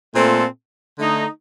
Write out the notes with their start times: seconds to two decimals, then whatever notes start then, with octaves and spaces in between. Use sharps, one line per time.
0.15 A#2 A3 C4 F4 A4
0.98 D3 A3 D#4